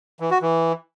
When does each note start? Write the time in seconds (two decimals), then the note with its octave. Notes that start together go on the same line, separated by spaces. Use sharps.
0.20 E3
0.31 F#4
0.42 E3